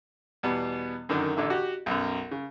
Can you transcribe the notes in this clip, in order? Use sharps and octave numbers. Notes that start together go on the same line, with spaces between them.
E2 B2 G3 B3
F#2 D3 D#3
A1 D3 E5
F#4 G4
B1 F#2
C#3